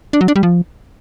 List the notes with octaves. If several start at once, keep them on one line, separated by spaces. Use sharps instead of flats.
D4
F#3
D4
G3
F3